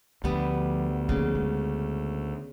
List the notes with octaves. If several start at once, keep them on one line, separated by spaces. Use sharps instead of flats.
D2 F3 G3 B3
C#3 F3 A#3
G#3